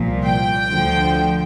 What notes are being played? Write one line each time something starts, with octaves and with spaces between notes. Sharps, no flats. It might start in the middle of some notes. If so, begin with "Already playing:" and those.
Already playing: C2 A#2 F3
G5
D2 D3 F3